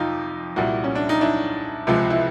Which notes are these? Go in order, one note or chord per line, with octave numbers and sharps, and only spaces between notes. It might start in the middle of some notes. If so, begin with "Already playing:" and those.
Already playing: F2 C3 D#4 F4
C2 A#2 G3 E4 F#4
C#4
D4
D#4
D4 E4
C#2 C3 F3 G#3
E4